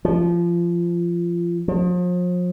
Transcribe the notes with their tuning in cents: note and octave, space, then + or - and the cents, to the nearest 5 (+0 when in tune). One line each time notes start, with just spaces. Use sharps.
F3 -20
F3 +40